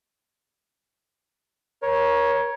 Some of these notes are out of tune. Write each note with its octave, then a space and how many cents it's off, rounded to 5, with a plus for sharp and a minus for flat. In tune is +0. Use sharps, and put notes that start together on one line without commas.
A#4 +30 C#5 +0